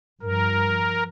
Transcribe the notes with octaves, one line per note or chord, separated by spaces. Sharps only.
G2 F3 A#4